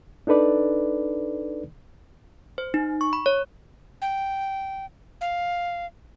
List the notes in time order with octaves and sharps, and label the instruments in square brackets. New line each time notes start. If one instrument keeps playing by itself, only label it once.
[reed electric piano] D4 D#4 A4 B4 D5
[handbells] C5
D#4
C#6
B5
C#5
[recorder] G5
F5